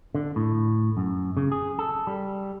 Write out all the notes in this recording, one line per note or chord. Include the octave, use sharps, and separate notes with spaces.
D3
A2
F#2
C#3
G#4
A4
G3